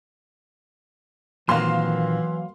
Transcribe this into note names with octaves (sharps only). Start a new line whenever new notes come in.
A#2 D#3 E3 F#3 A#3 C4 F5 C6